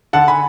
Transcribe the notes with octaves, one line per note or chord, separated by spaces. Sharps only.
D3 F#5 A5
G#5 B5